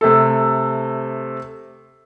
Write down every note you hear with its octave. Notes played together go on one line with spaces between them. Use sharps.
C3 A3 A4